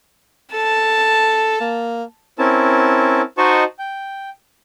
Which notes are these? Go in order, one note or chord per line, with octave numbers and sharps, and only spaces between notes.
A4 A5
A#3
C4 C#4 E4 A#4 A5
D#4 F#4 C5 D#5 A5 C#6
G5